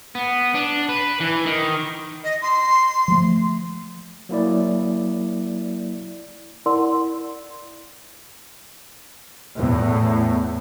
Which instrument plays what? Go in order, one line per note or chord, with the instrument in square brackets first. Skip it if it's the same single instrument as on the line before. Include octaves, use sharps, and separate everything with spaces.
[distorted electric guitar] B3
D4
B4
E3
D#3
[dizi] D#5
C6
[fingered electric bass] F3 G3 A3
[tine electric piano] F#3 A#3 E4 D5
[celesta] E4 A#4 D5 F#5 C6 E6
[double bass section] E2 A2